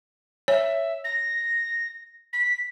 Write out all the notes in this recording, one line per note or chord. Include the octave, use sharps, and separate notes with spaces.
C#5 E5
A#6
B6